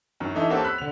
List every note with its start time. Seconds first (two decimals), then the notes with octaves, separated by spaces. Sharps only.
0.20 F#2 D#3
0.34 E3 A3 D#4 E5
0.50 A#3 C4 C#4 F#4 G4 A4
0.64 B5 E6 F#6 B6
0.78 D3 F7